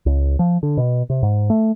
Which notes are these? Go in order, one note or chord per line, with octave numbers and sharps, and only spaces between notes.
C#2
F3
D3
B2
C3
G#2
A3